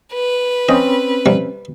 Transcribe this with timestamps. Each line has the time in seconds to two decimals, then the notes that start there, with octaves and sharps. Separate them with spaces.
0.13 B4
0.69 C4 C#4 D#5
1.26 C3 G3